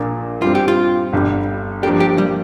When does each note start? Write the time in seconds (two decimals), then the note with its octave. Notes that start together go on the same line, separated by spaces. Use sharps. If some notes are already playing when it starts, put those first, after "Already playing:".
Already playing: A#1 A#2 A#3 D4
0.42 G2 G3 C4 F4
0.55 G4
0.68 F4
1.13 G1 G2 G3
1.83 G2 F3 A#3 D4 G4
2.00 G4
2.18 G3